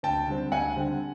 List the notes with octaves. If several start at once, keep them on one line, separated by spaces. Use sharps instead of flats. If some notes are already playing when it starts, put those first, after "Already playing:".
D2 G5 A5
D3 G3 C4
D2 F#5 G#5
D3 G3 C4